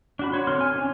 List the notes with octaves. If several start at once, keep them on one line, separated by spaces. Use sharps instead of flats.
D4 F#4 B5
F#4 C#5 C6
D3 C4 C#5 C6 F6
G#5
C#4 D4 F4 C#5